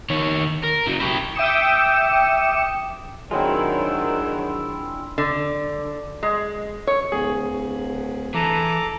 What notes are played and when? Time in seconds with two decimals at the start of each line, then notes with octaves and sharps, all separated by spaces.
0.10 D#3 C#5
0.63 A#4
0.87 C#3 F#3
1.00 E4 G4
1.35 E5 G5 D6 D#6 C#7 E7
3.31 D#3 F#3 G#3 C4 D4 E4 F4
5.18 D3
6.23 G#3
6.87 C#5
7.12 D1 G#4
8.34 E3 A4 A#5 D6